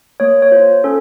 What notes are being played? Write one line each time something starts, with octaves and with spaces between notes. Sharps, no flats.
A#3 C#5
C#5
F4 C5
C#4 A4